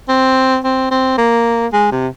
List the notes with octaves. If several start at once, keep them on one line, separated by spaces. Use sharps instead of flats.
C4
C4
C4
A#3
G#3
C3